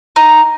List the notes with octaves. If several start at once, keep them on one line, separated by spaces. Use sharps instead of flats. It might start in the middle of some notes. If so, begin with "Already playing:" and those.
D#4